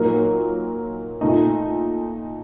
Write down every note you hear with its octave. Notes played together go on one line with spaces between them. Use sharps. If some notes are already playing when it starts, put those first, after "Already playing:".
Already playing: A#2 F#3 A#3 D#4 A#4
A#2 A3 D#4